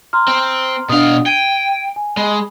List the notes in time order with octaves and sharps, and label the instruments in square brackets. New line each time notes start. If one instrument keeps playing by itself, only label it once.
[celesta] A#5 C6 F6
[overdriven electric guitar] C4
[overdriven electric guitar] B2 F5 [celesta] D4 D#6
[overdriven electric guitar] G5 [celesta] G#6 D#7
[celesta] G#5
[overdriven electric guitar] G#3 [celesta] B5